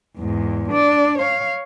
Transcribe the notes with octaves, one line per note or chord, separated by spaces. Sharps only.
E2 G#2
D4 D5
C#5 F5